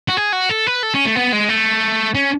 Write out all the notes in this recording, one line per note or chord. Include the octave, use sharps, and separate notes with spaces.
F#4
G#4
F#4
A4
B4
A4
C#4
A3
B3
G#3
A3
C#4